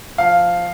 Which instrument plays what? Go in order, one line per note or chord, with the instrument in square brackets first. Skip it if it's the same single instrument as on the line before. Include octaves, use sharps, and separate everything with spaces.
[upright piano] F3 F5